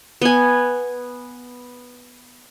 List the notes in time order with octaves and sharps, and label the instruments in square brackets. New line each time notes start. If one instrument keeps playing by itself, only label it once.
[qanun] B3 G#5